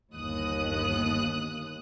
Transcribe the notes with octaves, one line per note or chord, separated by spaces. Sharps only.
G1 D#2 D#6 F#6